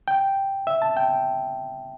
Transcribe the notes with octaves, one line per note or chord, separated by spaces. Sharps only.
G5
E5
A5
G5